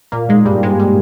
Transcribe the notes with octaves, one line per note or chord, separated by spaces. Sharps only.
A#2 A#3
G#2 G#3
G2 G3
G#2 G#3
G3